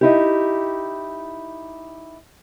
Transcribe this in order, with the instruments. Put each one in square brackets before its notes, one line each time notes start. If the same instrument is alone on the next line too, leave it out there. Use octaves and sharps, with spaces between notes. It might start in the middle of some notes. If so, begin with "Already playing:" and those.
[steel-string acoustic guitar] D#4 E4 G4